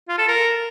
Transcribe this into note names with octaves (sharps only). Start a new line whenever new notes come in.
F4
A4
A#4